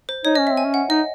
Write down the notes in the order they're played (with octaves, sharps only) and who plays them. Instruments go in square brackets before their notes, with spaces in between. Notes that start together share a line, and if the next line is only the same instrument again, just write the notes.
[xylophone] C5
[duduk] D#4 [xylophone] C#5
[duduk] C#4 [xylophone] D#5
[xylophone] E5
[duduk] C4
[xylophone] G#5
[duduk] C#4
[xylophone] F#5
[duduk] D#4 [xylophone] D#5